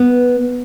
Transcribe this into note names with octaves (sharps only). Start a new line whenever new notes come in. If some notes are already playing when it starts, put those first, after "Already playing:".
Already playing: B3